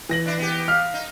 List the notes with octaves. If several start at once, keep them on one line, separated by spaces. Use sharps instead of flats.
E3 A#6 F#7
D4 E4
B3 G4
F5 F6
D#4